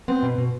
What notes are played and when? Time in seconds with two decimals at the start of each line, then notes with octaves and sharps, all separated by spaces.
0.08 B3 C4
0.23 B2
0.38 B2